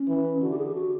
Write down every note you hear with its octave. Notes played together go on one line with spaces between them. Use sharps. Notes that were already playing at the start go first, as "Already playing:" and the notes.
Already playing: C#4
E3
D3 F#4
G4
G#4
G4
F#4